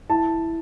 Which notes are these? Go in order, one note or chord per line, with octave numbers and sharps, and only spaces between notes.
E4 A5